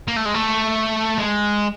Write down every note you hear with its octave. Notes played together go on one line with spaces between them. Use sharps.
A#3
A3
G#3
A3
G#3